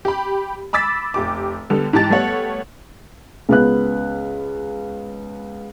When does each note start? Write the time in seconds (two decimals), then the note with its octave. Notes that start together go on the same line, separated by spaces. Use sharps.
0.05 G4 B5
0.73 B5 D6 E6 A6 B6
1.14 F1 G4 D6
1.70 D3 G3 B3 A4
1.93 G#2 E3 G4 A5 A6
2.10 G3 A3 B3 A4 C#5 F#5
3.49 C#2 B3 F#6